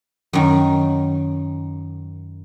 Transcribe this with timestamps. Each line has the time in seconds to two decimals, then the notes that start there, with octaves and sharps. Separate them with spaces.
0.33 F#2 D#3